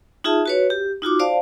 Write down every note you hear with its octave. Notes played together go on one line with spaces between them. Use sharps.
D#4 F4 G#4 E5 A5
F#4 B4 C#5
G4
D#4 F4 F#4 D6
C5 D5 F5 A5